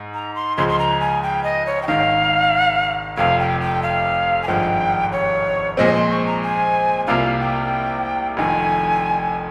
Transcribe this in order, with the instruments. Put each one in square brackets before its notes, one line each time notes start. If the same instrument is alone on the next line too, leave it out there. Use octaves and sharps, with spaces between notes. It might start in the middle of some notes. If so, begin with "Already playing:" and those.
Already playing: [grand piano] G#2
[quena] A#5
C6
[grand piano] C#2 C#3 F3 G#3 [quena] C6
[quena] C6
A#5
G#5
G5
D#5
C#5
G5
[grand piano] G#1 G#2 D#3 [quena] F5
[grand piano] F1 F2 C3 [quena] F5
[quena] G5
G5
F5
G#5
[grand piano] G#1 G2 F3 G#3 [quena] G5
[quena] C#5
[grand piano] A#2 F3 G#3 C4 [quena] D#5
[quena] C6
C#6
A#5
G#5
[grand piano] C2 C3 G3 A#3 F4 [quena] F5
[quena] G5
[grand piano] F1 F2 D#3 [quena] G#5